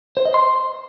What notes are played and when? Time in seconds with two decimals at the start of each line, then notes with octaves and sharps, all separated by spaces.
0.17 C5
0.25 D#5
0.34 C6